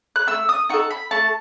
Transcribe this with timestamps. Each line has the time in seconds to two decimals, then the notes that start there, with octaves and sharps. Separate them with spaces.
0.16 F#6
0.27 A3 E6
0.49 D#6
0.69 D#4 F#4 A4 C#6
0.91 B5
1.11 A3 A5